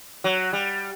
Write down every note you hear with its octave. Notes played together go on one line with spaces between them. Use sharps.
F#3
G3